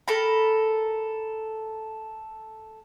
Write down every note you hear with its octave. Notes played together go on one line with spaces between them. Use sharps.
A4 A#4 B5